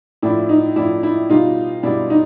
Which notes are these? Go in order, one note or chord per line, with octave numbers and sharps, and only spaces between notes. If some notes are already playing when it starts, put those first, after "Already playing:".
A2 F3 D4 E4
D#4
A2 F3 D4 E4
D4 E4
B2 G3 D#4 F4
B2 G3 D4 E4
D#4